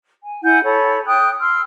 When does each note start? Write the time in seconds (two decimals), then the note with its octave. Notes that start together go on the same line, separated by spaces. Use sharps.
0.23 G#5
0.43 E4 F#5 G#5 G6
0.64 A4 C#5 B5
1.07 G5 D#6 F#6
1.40 C6 E6 F6